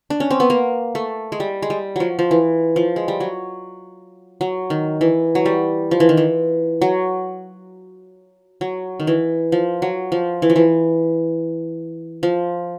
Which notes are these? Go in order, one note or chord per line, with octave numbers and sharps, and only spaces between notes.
D4
C#4
C4
B3
A#3
A3
G#3
G3
G#3
G3
F3 F#3
F3
E3
F3
G#3
G3
F#3
F#3
D#3
E3
F#3
G3
F3
E3
D#3
E3
F#3
F#3
D#3
E3
F3
F#3
F3
E3
F3
E3
F3